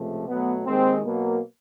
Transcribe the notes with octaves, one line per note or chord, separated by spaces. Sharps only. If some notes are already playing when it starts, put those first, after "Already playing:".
Already playing: C#2 C3 F3 A3
B2 F#3 A3 B3
D#2 D#3 G#3 C4
B2 F#3 A#3